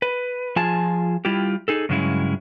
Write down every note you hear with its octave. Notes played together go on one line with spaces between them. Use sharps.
B4
F3 F4 G#4 G#5 A5
G3 E4 F4 G4
D#4 G#4 A4
G2 C#3 F#3 G#3 C#4 E4